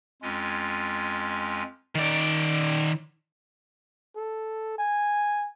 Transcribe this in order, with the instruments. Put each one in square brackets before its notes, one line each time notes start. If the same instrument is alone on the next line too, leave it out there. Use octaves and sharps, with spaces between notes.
[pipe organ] F2 G#3 C#4 F4
[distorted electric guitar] D#3 D5
[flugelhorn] A4
G#5